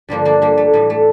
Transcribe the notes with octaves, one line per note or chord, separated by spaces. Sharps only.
G2 D3 F3 G3 A#3
A#3 D4
G3 A#3
A3
A2 E3 G3
A3